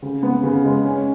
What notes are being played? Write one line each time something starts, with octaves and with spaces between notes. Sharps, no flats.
C#3
B3
C#3
G#3
C#4